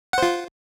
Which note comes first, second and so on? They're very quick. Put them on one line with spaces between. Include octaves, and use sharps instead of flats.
F#5 C5 F4